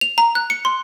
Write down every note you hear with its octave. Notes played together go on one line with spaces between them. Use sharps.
F7
A#5
F#6
C#7
C6